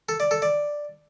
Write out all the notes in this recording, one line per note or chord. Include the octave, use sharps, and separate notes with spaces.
A4
D5
A4
D5